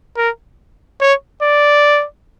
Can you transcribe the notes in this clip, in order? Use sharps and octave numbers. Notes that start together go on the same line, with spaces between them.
A#4
C#5
D5